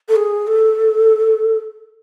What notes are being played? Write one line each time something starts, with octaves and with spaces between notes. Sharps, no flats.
A4
G#4
A4